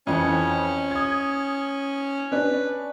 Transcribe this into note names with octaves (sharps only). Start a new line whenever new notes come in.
F2 E3 C#4 C#7
D#6 G#6
C#4 D4 B4